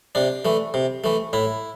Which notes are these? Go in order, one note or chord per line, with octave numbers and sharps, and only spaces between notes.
C3 D4
E3 A3
C3
E3 A3
A2 E4